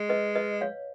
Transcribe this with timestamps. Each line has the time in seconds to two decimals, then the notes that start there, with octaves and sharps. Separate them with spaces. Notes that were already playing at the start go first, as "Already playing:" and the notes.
Already playing: G#3
0.09 B4 D#5
0.35 B4 D#5
0.61 C#5 F5